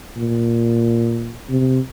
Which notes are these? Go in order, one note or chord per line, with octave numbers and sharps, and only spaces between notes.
A#2
C3